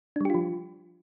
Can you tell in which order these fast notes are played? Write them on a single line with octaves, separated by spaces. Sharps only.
D4 G3 G4 F4 F3